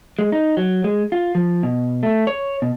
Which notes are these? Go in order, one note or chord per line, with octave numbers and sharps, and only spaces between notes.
G#3
D#4
F#3
G#3
F4
F3
B2
A3
C#5
B2